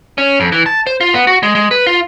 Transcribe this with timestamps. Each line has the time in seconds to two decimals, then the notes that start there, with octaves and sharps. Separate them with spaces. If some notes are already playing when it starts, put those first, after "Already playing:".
0.18 C#4
0.40 F2
0.52 E3
0.66 A5
0.87 C5
1.01 F4
1.14 B3
1.27 F#4
1.43 G#3
1.55 G#3
1.71 B4
1.87 F4